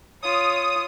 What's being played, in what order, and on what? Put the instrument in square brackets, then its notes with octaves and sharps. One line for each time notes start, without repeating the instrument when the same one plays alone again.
[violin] F4 C#5 [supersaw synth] D#6